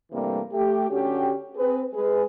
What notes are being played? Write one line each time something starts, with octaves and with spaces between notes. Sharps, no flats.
G2 C3 E3 G3 A3 A#3
A3 G4
D3 C#4 F#4 G4
C4 G#4 B4
G#3 G#4 B4